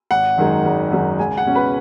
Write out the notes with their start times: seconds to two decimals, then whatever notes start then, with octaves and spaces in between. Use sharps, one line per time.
0.11 G#1 F#5
0.38 F#2 D#3 G#3 D#4
0.65 G#1
0.92 F#2 D#3 G#3 D#4
1.19 C#2 G#5
1.37 F#5
1.46 B2 G#3 C#4
1.55 B4